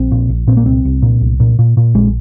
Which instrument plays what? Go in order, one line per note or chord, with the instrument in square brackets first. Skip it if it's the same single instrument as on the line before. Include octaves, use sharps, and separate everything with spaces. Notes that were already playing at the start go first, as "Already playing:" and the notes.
Already playing: [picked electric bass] A#1 C4
A#2
A#1
A#2 C4
A#3
C2 C4
C2
A#2
C2
A#2
A#2
A#2
A#1 G#3